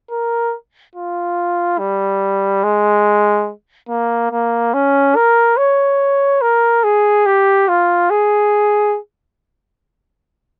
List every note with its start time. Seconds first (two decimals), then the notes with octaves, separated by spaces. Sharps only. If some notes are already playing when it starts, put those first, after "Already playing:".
0.10 A#4
0.95 F4
1.79 G3
2.63 G#3
3.89 A#3
4.31 A#3
4.74 C#4
5.16 A#4
5.57 C#5
6.42 A#4
6.83 G#4
7.26 G4
7.68 F4
8.10 G#4